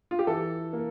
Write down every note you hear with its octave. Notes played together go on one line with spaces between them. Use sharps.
F4
G4
E3 A4
A#3